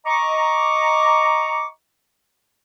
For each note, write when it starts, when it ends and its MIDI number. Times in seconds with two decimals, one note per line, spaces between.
0.06 1.66 75
0.06 1.66 82
0.06 1.66 85
0.06 1.66 86